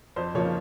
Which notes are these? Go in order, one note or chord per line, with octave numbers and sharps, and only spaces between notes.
F2 C5
C#3 F3 A#3 C#5